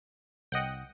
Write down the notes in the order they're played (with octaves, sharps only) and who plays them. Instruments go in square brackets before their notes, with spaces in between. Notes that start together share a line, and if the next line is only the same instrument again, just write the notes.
[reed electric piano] C2 [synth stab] D#5 F#5 G5